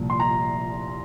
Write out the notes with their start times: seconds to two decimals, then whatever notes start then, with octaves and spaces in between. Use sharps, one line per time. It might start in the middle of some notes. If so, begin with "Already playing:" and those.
Already playing: C2 A#2 F3
0.10 C6
0.20 A#5